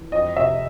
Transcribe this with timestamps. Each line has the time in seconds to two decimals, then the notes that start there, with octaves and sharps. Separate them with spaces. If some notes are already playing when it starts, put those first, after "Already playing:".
Already playing: E3
0.12 F2 D#5
0.37 C3 E5